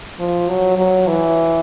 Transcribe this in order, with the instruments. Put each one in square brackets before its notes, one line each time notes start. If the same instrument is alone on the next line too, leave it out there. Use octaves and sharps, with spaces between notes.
[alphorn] F3
F#3
F#3
E3